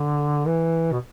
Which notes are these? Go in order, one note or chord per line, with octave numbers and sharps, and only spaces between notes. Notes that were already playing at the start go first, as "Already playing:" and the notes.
Already playing: D3
E3
B2